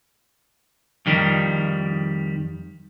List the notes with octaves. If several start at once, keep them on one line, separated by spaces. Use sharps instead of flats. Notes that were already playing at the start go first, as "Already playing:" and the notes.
F2 D#3 G3